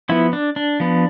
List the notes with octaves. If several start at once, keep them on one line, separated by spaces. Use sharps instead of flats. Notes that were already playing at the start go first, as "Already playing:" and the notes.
F3 B3 E4
D4
D4
F3 B3